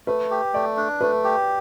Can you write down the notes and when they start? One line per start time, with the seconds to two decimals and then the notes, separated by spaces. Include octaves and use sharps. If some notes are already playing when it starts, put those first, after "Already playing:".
0.07 A3 B4
0.31 G4
0.54 A3 D5
0.77 D4
1.01 A3 B4
1.24 G4